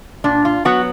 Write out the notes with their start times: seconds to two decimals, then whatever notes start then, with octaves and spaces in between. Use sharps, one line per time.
0.24 A#2 D4
0.45 F4
0.65 F#3 B3 F#4